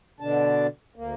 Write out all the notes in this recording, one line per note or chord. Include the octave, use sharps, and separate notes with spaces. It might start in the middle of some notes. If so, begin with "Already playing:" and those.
B2 D3 D4 A5
D2 A#3